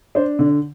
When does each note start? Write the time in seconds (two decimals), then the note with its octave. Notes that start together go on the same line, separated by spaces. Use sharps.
0.15 D4 C5
0.39 D3